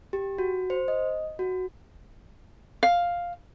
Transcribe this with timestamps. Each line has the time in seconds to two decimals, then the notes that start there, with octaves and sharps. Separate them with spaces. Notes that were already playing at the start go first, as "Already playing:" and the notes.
0.13 G4
0.38 F#4
0.70 C5
0.88 D#5
1.39 F#4
2.83 F5